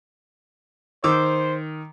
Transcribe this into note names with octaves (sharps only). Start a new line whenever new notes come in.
D#3 C5 D6 E6